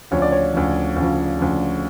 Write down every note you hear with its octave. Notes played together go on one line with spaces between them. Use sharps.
D2 C#3 F3 C#5
D5
C#5
D2 C#3 F3
D2 C#3 F3
D2 C#3 F3